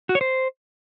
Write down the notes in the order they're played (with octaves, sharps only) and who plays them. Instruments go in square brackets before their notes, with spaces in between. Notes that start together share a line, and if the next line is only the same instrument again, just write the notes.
[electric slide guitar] F#4
C#5
C5